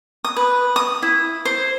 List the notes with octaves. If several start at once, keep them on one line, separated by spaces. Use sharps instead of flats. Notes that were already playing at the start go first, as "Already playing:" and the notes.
D#6
B4
D#6
E4
C5